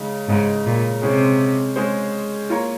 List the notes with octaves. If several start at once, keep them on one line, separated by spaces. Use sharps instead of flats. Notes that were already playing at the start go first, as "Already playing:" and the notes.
Already playing: C#3 G#3 D#4
G#2 C#3 G#3 D#4
A#2
C3 G#3 C#4 G#4 C5
G#3 C#4 G#4 C5
A#3 F4 A#4 C#5